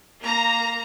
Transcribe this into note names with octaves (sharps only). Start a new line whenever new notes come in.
A#3 A#5